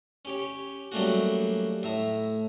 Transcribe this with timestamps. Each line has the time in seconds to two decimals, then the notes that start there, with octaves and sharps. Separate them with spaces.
0.25 C#4 G4 C#5
0.92 F#3 G3 A3 A#3 C#4 F#4
1.83 A2 E5 A#5